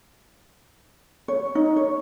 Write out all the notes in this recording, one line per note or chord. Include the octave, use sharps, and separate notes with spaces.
C#5
D#4
C#5